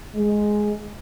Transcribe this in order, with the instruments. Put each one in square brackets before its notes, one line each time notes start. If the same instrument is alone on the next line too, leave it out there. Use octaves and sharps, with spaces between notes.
[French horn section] G#3